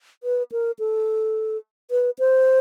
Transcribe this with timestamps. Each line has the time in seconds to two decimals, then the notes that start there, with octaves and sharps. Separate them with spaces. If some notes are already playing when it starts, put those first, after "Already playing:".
0.23 B4
0.52 A#4
0.79 A4
1.91 B4
2.19 C5